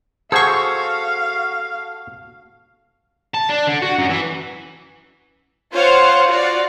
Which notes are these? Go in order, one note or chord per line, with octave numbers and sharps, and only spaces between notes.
F#4 G#4 A4 C5 F5 C#6 E6
A5
D4
D3
F#4
F#2
E3
F4 C5 C#5 F5 F#5
F4 F#4 D5 F5